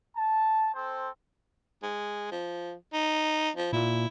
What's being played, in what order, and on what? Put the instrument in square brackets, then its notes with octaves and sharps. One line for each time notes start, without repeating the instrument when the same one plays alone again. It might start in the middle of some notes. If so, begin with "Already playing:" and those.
[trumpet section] A5
C4 A4 C5
[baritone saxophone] G#3
F3
D#4
F3
[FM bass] A#2 [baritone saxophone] E4